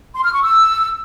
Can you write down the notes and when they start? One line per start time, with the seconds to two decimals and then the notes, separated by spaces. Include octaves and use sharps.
0.14 C6
0.23 F6
0.33 C#6
0.42 E6